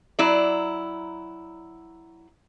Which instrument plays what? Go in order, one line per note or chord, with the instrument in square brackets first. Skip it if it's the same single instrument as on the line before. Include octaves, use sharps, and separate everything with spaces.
[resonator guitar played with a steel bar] F#3 E4 D5